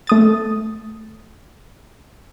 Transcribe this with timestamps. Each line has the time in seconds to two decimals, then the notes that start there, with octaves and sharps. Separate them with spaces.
0.07 A3 D#6 A6